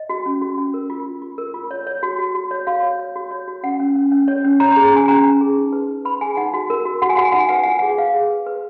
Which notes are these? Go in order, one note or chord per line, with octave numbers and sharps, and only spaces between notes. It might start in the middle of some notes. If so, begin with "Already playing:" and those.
Already playing: D#5
F#4
C#4
F#4
C#4
A#4
F4
F4
F4
A#4
F4
C#5
C#5
F#4
F#4
F#4
C#5
F#4 F5
C#5
C#5
F#4
C#5
F#4
C#4 F#5
C#4
C#4
C#4
C#5
C#4
C#5 A#5
A#5
G#4
A#5
C#4 G#5
C#4 A#5
C#4
G#4
D#4
B4
D#4
B4 B5
G#4 G#5
D#4 F#5
F#4
A#4
F#4
F#4 F#5
G#5
F#4 F#5
G#5
D#4 F#5
G#5
B4 F#5
G#5
F#5
F4
G#5
G#4 F#5
B4 F5
G#4
B4
B4